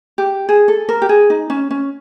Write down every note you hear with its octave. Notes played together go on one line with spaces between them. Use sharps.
G4
G#4
A4
A#4
G4
G#4
D#4
C#4
C#4